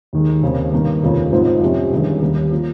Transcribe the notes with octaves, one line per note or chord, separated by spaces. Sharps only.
D#2 D#3 G#3
D#2 C#3 G#3 C4
G2 D#3 A#3
F1 D#2 C#3 F3 A#3
G#1 G#2 F3 C4 F4
F2 C3 G3 C#4
G1 G2 D#3 G#3 C#4
D#2 D#3 G3 A#3 C#4
F3 A#3